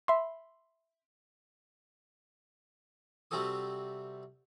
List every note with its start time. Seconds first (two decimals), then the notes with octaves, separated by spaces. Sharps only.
0.08 E5 B5 C6
3.31 C3 G3 C4 F#4 A4 D#6